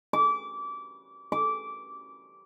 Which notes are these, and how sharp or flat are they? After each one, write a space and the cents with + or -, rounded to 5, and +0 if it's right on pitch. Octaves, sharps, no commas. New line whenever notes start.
D6 -25
D6 -15